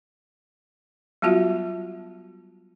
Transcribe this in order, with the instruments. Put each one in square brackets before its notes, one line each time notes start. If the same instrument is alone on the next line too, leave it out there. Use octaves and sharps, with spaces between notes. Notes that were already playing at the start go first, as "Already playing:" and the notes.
[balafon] F#3 G3 B3 F4 F#4 E5